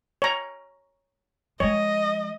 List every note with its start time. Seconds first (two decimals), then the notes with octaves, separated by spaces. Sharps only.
0.22 C#5 A#5
1.60 F3 G#3 C#5 D#5